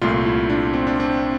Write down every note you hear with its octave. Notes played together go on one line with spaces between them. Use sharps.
C2 A#2 A3 F4
E4
D4
C4
D4
C4